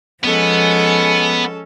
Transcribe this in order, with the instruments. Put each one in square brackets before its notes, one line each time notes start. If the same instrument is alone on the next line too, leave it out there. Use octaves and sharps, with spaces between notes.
[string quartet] F3 G#3 [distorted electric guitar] B3 [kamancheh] C#4 A4